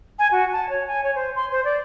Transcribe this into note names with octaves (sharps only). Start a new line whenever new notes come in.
G#5
F#4
A5
C#5
G#5
C#5
C5
C6
C5
D5